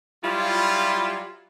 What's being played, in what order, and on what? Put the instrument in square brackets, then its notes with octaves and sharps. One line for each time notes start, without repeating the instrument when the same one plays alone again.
[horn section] F#3 G3 E4 F4